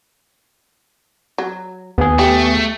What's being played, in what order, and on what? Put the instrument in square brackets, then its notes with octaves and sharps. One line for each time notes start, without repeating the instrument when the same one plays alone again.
[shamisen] F#3
[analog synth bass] D#2 [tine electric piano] B3 G#4
[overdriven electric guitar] A3 [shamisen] G4